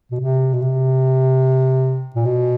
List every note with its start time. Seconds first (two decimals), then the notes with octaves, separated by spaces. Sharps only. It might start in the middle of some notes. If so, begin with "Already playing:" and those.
0.11 B2
0.20 C3
0.54 B2
0.62 C3
2.16 A#2
2.25 B2